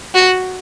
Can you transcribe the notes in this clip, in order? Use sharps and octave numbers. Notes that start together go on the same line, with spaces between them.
F#4